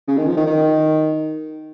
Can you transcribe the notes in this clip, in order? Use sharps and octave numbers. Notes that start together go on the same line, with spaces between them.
C#3
D#3
F3
D#3
D#3